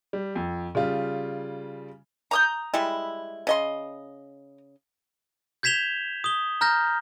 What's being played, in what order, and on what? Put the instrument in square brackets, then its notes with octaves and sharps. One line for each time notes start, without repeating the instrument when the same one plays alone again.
[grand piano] G3
F2
C#3 G3 F4
[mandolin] A#5 D#6 G6
[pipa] G3 G#3 E4
C#3 D#5 C6
[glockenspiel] G6 G#6 B6 E7 F7 G7
D#6 G7
A#5 F6 G6 A#6